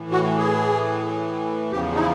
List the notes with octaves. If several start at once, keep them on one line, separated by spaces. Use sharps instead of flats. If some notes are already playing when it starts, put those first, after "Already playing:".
Already playing: A2 E3
F#4
G#4
E2 C#3 F3 G4
D#4
E4